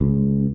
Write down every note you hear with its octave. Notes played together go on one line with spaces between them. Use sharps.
C#2